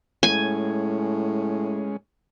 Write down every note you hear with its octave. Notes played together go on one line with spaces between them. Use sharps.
A2 G#3 C#4 G#5